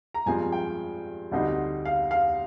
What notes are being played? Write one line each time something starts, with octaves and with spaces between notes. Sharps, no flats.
A#5
G2 F3 G#3 C4 G#5
G5
D2 D3 G3 C4 D#4
F5
F5